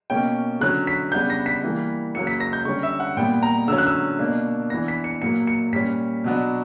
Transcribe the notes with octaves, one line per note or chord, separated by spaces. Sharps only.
B2 A#3 C#4 G5
D3 F#3 C#4 F#6
B6
C#3 G3 B3 D4 G6
A#6
B6
E3 G3 A#3
C#3 F#3 A#3 C#4 C#7
B6
A#6
G6
D3 G3 C#4 C#6
E5
F#5
A#2 G3 B3 G5
A#5
D3 F#3 C#4 E6
F#6
E6
B2 A#3 D4
E3 B3 D4 A#6
B6
C#7
A#2 F#3 A#3 C#7
C#7
A#2 G3 C#4 B6
B2 F#3 B3 D4